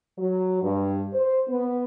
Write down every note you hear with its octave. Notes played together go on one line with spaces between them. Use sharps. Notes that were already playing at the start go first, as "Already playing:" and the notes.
F#3
G2
C5
B3